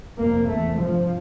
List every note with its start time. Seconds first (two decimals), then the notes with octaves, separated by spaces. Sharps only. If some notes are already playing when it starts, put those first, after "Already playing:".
0.18 F2 C3 A#3
0.48 E2 C3 A3
0.78 G2 F3